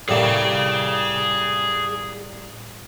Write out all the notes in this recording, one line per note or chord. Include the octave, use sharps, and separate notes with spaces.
A2 G3 A#3 G#4 F5